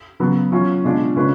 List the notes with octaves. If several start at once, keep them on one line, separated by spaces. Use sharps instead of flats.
C#3 F#3 B3
F#3 C#4 F4
B2 G#3 D4 F4
C#3 G#3 C#4 F4 B4